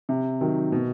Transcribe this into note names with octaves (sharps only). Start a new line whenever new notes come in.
C3
D#3 F#3
B2